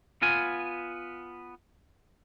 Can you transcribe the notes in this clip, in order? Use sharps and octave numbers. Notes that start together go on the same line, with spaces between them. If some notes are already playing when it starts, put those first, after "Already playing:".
B3 F4 G#5